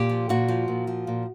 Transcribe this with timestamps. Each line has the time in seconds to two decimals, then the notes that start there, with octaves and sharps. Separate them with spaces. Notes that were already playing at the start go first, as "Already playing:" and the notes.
Already playing: A#2 G4
0.10 F3
0.29 A#2 F#4
0.48 F3
0.68 A#2
0.87 F3
1.07 A#2